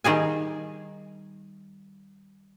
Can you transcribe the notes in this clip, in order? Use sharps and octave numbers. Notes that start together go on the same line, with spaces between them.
D#3 G3 G#4 G#5